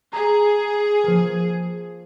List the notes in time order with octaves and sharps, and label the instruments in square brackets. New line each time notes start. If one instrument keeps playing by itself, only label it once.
[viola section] G#4 [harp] A#5 D#6
[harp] F3 A#3